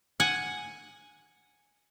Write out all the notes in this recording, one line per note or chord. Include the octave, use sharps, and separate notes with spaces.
F#5 G#5